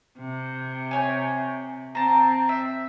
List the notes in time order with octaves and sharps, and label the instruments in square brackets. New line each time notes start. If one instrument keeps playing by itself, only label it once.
[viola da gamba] C3
[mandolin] A3 C#5 G#5
[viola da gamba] C4 [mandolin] A5 A#5
[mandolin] E5